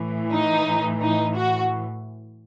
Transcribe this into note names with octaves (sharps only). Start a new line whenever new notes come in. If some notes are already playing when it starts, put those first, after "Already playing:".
Already playing: A2 E3
D#4
D#4
F#4